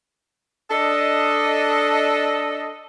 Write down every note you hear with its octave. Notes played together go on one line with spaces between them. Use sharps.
D4 A4 D#5